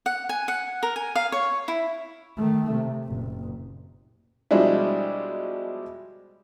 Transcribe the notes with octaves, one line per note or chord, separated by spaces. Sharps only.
F#5
G#5
F#5
A#4
G#5
F5
C#5
E4
D#3 A3
C3
F#1 A#2
B2 F3 G3 G#3 D4 E4